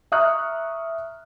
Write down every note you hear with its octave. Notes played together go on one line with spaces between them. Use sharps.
E5 A#5 C#6 D#6 F6 F#6